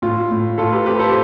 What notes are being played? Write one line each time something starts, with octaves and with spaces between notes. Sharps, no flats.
A2 F4
A2
A2 F4 A4
G4 B4
C4 G4 B4
A4 C5